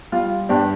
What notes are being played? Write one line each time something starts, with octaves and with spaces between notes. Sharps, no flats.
G3 F4
G2 D4 G4